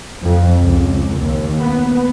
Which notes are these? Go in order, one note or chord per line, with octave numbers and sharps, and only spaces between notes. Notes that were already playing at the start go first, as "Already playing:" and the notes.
F2
C#2
D#2
B3